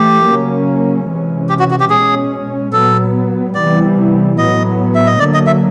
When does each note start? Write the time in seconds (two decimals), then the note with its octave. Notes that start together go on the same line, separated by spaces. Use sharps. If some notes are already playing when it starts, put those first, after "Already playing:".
Already playing: E3 A3 G4
0.26 C#3 F#3 A#3 C#4
1.08 C3 E3 G#3 C#4
1.49 G4
1.59 F#4
1.71 F#4
1.80 G4
1.90 B2 G#3 C#4 G#4
2.73 A#2 F#3 B3 A4
3.55 C3 E3 G3 B3 D5
4.37 A2 F#3 B3 D#5
4.95 E5
5.06 D#5
5.19 D3 F#3 A#3 D5
5.34 D#5
5.47 E5